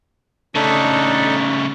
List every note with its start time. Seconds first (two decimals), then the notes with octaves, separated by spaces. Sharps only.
0.55 C#3 A3 D4 D#4 A4